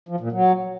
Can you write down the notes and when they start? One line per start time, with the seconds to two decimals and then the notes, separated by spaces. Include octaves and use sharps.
0.09 F3
0.20 A#2
0.32 F#3